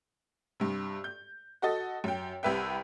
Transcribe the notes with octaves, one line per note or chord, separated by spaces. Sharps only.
G2 C3
G6
F#4 A4 D#5 A6
F#2 G5
C2 C3 B4 E5 G5